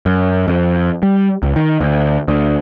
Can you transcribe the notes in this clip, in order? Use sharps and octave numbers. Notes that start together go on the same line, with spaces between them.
F#2
F2
G3
C#2
D#3
D2
D2